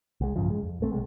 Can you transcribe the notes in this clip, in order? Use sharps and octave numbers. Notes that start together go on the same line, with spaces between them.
C2 G#3
A1 G2 C#3 F3
G#3
F2
A#1 A3 C4
B1 C3 G#3